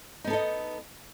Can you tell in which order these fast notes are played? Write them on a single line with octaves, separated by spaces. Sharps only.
D#4 B3 A4 D#5